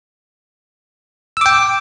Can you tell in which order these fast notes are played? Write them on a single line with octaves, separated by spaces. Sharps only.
E6 D6 G5